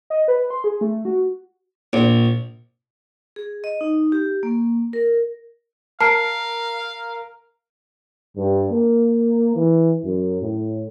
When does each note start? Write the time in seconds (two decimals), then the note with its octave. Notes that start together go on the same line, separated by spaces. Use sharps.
0.10 D#5
0.28 B4
0.50 C6
0.64 G#4
0.81 A3
1.05 F#4
1.93 A#1
3.36 G#4
3.64 D#5
3.81 D#4
4.12 G4
4.43 A#3
4.93 A#4
6.00 A#4 F5 A5 F6 C7 D7
8.37 G2
8.71 A#3
9.56 E3
10.04 F#2
10.41 A2